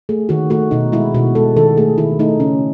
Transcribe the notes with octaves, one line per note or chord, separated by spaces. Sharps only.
A3 G#4
D#3 F#4
A3 F#4
B2 D#4
G#3 E4
B2 F#4
G#3 A4
D#3 A4
A3 G#4
D#3 E4
A3 D#4
C#3 C#4